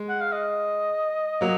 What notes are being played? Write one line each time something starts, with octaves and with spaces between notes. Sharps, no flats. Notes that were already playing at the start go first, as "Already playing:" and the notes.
Already playing: G#3
F#5
F5
D#5
F#3 A#3